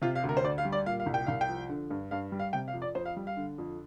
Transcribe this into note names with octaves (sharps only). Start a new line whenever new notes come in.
C3 F4
F5
D2
A#4
C5
D2 D5
F5
G3
D5
A#2 F5
F5
C2
G5
C2 F5
G5
F3
D3
G2
G2 F5
G3
F5
C3 G5
F5
F2
D5
F2 C5
F5
G3
F5
D3
F2